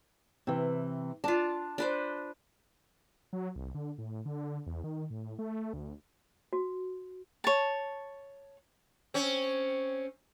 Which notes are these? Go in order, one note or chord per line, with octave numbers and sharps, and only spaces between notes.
C3 E3
D4 F4 A5
D4 B4 C5
F#3
C2
D3
A2
D3
E2
D#3
A2
A3
D2
F#4
C#5 A5
C4 C#4